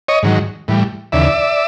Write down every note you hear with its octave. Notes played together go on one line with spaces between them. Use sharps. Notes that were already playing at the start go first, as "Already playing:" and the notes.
C#5 D#5
G#2 D#3 F#3
A2 E3 G3
D#2 C#3 E3 D5 E5